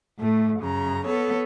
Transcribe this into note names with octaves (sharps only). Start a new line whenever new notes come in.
A2 A3
F#2 C#3 A#5
B3 A4 C#5